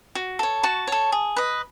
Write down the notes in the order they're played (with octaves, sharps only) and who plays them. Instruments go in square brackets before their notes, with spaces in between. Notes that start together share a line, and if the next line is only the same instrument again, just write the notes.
[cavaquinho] F#4
A4 C#5
F#4 A5 C#6
A4 C#5
G#4
B4 D#5